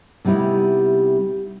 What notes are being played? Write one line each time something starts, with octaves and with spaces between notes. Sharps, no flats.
C3 G3 B3 D#4 E4